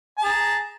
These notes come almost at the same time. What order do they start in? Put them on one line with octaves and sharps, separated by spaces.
A5 G#4 A#5